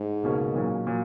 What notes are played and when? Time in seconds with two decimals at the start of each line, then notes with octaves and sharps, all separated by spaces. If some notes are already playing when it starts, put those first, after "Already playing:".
Already playing: G#2
0.23 C#2 B2 A#3 C#4
0.54 B1 A#2 F#3 C#4
0.87 A#2 F#3